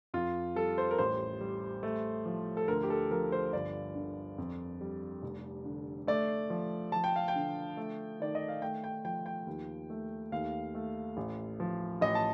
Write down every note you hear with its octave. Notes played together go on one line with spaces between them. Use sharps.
F2 F4
G3 A4
C5
A#4
A1 C5
G3
A3
F3
A4
D2 A#4
G4
A4
F3 A#4
C5
G1 D5
D3
F2
G3
F1
D3
A3 D5
F3
F3 A5
G5
F5
G5
D3
A3
D#3 D5
D#5
F5
A3 G5
G5
F3 G5
G5
D#2
A3
D#2 F5
A3
A1
F3
A1 D#5
A5